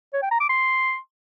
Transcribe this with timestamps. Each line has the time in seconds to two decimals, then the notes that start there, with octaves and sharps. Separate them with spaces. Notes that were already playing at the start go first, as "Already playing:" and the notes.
0.13 C#5
0.22 G5
0.31 A#5
0.40 D6
0.49 C6